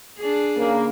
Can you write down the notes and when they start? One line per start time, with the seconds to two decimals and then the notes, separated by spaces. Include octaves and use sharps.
0.18 D4 G#4
0.56 C#3 A#3